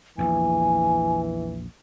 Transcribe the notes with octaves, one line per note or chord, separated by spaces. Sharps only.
A#1 E2 E3 G#5